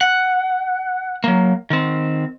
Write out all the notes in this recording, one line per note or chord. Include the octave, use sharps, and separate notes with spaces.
F#5
F#3 A#3
D#3 C4